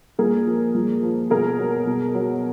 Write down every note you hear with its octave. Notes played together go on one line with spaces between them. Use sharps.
A#2 G#4 A#4
F3
A#2
F3
B2 G#4 A#4
F#3
B2
F#3